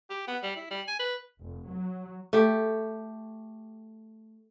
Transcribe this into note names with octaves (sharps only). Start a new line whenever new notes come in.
G4
B3
G3
E4
G3
G#5
B4
F1
F#3
A3 G4